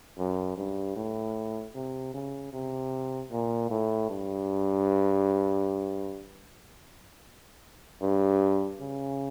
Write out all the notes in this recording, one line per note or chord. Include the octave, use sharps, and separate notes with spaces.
F#2
G2
A2
C3
C#3
C3
A#2
A2
G2
G2
C#3